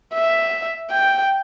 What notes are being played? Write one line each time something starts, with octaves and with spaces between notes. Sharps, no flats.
E5
G5